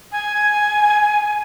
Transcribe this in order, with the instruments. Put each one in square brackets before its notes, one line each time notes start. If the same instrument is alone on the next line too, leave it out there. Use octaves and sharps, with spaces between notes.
[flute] G#5